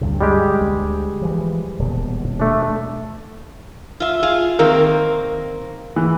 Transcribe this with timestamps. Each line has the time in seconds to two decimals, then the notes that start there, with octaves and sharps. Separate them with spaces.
0.01 D2 G2 C3
0.21 G3 G#3 G4
0.61 D2
1.22 E3 F3
1.79 D#1 B2
2.40 A3 D4
4.00 F4 E5
4.23 F4 G#4
4.59 D#3 A#3 C4 A#4
5.96 E3